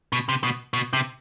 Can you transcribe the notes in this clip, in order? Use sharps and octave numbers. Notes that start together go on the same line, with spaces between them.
B2
C3
B2
B2
C3